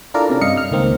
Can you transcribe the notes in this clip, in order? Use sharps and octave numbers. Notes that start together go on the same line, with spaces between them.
D4 E4 F4 A4 A#4 D5
C3 C#4
G2 D#5 F5 C#7
F6
C#2 D#3 A#3 C4